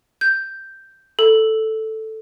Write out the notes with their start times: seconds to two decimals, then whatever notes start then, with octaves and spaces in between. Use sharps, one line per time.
0.21 G6
1.19 A4